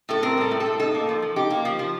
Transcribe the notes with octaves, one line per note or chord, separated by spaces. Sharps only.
A2 A4
C4 A#4
G3 A4
A2
A4
A2
D#4 A4
A#3
F3
F3
D#4 G4
A#3
F3
F3